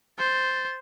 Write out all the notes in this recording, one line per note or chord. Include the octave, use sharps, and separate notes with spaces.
C5 A6